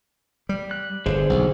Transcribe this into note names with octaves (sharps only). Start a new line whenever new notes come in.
G3
F#6
G1 D3 G#4 C5
B1